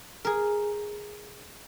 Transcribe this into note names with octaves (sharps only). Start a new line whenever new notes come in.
G#4 A#4